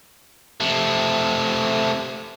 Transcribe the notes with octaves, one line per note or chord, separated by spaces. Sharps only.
C3 A3